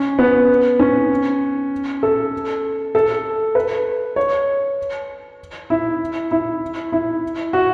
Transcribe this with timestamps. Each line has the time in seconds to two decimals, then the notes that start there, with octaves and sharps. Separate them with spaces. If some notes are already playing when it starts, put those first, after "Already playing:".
Already playing: C#4
0.19 B3
0.79 C#4
2.03 A4
2.95 A4
3.55 B4
4.16 C#5
5.70 E4
6.31 E4
6.92 E4
7.53 F#4